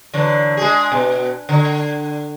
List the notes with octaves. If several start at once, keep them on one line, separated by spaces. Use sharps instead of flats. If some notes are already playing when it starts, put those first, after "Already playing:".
D3 E3 F#3
G#3 G#4
B2
D3